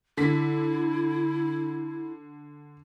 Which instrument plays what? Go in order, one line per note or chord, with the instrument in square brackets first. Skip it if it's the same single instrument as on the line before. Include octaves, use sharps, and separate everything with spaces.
[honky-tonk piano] D3 B6 [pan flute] E4